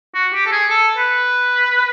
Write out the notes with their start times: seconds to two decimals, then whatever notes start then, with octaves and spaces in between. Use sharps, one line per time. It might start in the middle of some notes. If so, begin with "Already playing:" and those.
0.14 F#4
0.33 G4
0.46 A4
0.52 G#4
0.69 A4
0.97 B4